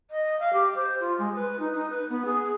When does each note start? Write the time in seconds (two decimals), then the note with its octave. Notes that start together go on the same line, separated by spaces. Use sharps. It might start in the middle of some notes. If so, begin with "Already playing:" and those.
0.10 D#5
0.39 F5
0.53 G4
0.75 C5
1.00 F4
1.18 G#3
1.35 B4
1.59 D#4
1.73 D#4
1.90 B4
2.09 B3
2.25 G#4